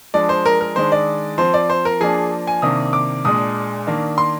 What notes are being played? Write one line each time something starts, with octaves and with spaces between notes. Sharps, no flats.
F3 G#3 D4 D5
C5
A#4
A#4
D#3 G#3 D4 C5
D5
F3 C4 C5
D5
C5
A#4
F3 A#3 D4 G#4
G#5
C3 D#3 A#3 D4 D#6
D6
A#2 G#3 D4 D#6
D#3 A#3 D4
C6